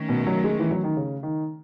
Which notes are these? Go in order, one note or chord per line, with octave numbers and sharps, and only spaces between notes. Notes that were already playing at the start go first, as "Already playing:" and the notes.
Already playing: D#3 A3 C#4
B2
F#3
G#3
E3
F#3
D#3
C#3
D#3